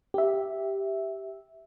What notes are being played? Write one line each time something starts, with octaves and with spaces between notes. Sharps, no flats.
G4 E5